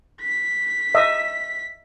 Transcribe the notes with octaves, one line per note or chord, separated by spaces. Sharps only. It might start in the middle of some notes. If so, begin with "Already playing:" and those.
B6
D#5 E5